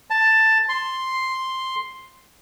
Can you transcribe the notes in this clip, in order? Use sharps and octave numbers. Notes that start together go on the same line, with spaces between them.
A5
C6